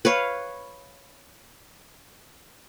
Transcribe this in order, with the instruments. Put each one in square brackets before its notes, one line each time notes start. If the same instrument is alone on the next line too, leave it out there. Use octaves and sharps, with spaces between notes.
[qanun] B4 C#5 F5